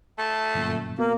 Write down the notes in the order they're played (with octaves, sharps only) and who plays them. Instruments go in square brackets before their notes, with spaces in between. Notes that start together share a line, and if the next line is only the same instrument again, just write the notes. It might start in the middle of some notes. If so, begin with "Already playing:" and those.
[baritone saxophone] A3 [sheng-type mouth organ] A5
[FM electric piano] G1 F#2 A#2
[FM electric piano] B2 [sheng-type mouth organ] A#3